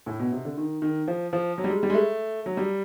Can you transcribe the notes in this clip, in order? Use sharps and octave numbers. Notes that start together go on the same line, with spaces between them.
A2
B2
C3
D3
D#3
D#3
F3
F3
F#3
G3
G#3
G3
G#3
A3
F#3
G3